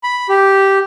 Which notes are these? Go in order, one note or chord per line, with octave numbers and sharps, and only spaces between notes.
B5
G4